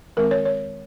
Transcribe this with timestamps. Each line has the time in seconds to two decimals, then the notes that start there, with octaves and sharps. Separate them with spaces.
0.17 D#3 G#3 C4 A#4
0.31 C#5
0.45 C#5